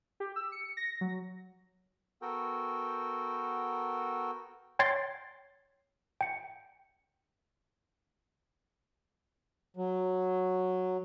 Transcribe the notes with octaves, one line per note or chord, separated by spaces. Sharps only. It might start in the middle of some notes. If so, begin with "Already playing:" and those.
G4
E6
C#7
A#6
F#3
B3 F#4 A4 A#4 G5
C#5 G5 C6 G#6 A6 C7
G5 C#7
F#3